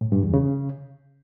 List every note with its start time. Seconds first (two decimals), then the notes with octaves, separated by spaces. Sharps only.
0.01 A2
0.12 G2
0.23 E2
0.34 C#3